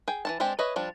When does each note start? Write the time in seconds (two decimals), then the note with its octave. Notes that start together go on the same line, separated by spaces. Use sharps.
0.08 G#4 G5
0.25 E3 E4 A5
0.40 G#3 C4 D4 G4
0.59 B4 C#5 D#5 E5
0.76 F3 G3 D4